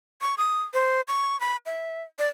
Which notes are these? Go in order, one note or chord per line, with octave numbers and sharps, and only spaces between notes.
C#6
D#6
C5
C#6
B5
E5
D5